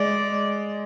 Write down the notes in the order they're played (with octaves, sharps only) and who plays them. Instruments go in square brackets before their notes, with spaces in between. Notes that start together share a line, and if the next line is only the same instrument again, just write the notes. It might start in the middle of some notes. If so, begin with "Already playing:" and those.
Already playing: [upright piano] G#3 [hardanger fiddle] D5